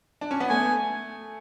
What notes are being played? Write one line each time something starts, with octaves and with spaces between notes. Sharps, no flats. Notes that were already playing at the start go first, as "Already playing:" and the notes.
D4
C#4
B3
A3 G#5